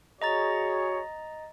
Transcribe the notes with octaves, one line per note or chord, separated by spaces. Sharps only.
F#4 G#4 C#5 D#5 A#5 A6